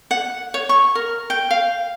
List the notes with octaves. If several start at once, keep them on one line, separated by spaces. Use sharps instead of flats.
F#5
C#5
C#6
A#4
G5
F5